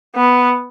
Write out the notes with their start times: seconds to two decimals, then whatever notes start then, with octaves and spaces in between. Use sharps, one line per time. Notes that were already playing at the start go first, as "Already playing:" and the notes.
0.16 B3